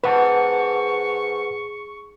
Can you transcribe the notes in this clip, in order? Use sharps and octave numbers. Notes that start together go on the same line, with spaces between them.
G#2 B4 F#5 A5 C#6